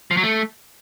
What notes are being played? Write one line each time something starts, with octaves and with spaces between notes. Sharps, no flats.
F3
F#3
A3